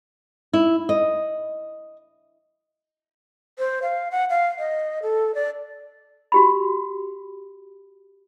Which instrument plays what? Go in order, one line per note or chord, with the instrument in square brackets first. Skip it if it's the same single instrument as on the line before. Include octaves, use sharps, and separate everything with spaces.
[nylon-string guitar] E4
D#5
[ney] C5
F5
F#5
F5
D#5
A4
D5
[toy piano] F#4 G4 B5